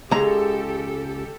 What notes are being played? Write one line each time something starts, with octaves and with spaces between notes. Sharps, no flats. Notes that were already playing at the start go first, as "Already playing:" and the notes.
C#2 G#3 G4 A4 A#5